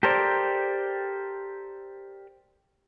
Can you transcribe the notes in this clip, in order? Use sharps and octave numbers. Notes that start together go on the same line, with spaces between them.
G4 A4 A#4 C5 D5